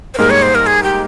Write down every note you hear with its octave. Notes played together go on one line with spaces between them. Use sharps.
C5
G#2 G3 A#3 D#4 G#4 A#4
C#5
C5
A#4
G#4
G4